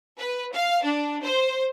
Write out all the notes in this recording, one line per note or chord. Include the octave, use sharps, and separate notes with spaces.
B4
F5
D4
C5